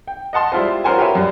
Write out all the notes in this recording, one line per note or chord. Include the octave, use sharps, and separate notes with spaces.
G5
D#5 F#5 A5 C6
G3 G#3 E4 F4 C5
C#4 F4 A#4 C5 F#5 G#5
F#4 G4 A#4 B4 C#5 E5
F#2 G3